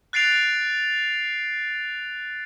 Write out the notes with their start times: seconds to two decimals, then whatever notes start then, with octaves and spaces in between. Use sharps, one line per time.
0.13 F#6 A6 C7 D7 F7